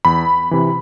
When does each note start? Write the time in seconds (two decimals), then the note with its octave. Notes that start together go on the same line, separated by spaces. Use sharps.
0.05 E2 B5
0.51 C3 E3